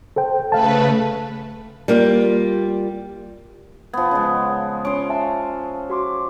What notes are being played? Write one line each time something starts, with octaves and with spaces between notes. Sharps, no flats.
A4 C5 G5
C#3 A3 B4 F5 A5
G3 A#3 F4
F3 B3 G#6
C#3 G#3
C#4 C6 D7
E5 G#5 A5
F#4 C6 D6